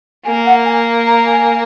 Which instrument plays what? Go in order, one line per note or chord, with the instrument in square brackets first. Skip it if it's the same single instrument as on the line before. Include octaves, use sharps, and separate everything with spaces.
[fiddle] A#3 [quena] G#5
[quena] F#5
G#5
A#5
G#5